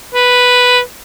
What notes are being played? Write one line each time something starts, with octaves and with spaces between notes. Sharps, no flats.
B4